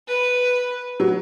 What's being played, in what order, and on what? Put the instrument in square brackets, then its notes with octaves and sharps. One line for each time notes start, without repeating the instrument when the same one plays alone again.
[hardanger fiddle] B4
[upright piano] F#3